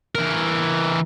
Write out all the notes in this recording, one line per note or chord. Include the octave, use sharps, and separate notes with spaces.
E3 A#4